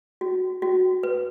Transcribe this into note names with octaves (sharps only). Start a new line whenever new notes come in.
F#4
F#4
B4